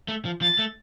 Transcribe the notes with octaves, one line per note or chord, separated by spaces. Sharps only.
A3
F3
F3 A6
A3